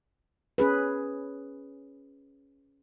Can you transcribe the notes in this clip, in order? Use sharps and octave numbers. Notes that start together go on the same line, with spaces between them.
C#4 G#4 B4